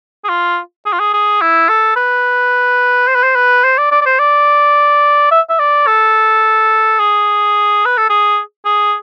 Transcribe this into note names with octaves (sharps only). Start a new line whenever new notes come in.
G#4
F4
G#4
F4
G#4
G#4
E4
A4
B4
C5
B4
C5
B4
C5
D5
D5
D5
C5
D5
E5
E5
D5
A4
G#4
B4
A4
G#4
G#4